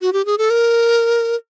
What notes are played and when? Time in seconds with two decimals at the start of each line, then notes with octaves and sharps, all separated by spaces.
0.01 F#4
0.13 G4
0.25 G#4
0.38 A4
0.50 A#4